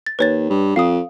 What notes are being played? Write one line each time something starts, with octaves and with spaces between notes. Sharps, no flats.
A6
D#2 B4 C#5 A6
G2
F2 F5 D#6